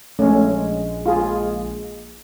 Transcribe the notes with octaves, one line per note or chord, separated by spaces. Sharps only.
A#1 G#3 A3 C#4
F4 G#4